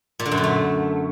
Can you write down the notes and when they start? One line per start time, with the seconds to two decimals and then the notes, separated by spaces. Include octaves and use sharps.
0.20 A#2
0.26 D3
0.32 F#2
0.38 A#2
0.44 A3